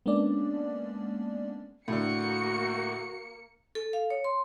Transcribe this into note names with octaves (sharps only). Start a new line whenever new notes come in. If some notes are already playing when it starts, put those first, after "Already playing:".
G#3 A#3 B3 C#4 D4 D5
A2 D3 A#3 F#4 C#7
A4
F5
C#5
C6